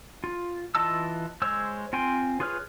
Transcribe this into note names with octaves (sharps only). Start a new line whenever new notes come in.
F4
E3 F4 D#5 A5 E6
G#3 C5 C#5 E6
C4 F4 G5 G#5 C6
F4 G#4 B4 C#5 F6